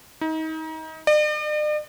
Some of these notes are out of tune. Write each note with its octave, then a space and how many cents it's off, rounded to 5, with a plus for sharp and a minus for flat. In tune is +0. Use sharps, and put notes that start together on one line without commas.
D#4 +30
D5 +45